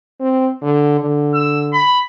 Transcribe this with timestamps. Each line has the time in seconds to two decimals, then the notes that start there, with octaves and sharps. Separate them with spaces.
0.20 C4
0.62 D3
1.01 D3
1.34 E6
1.73 B5